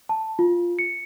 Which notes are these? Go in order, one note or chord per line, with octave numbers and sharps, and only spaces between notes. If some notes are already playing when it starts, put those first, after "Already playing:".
A5
F4
C#7